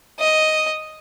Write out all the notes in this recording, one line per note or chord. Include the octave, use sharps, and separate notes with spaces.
D#5